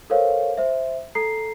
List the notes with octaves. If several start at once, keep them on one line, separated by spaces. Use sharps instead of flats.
A4 A#4 C5 C#5 F5
C5 E5
A4 A#5 C7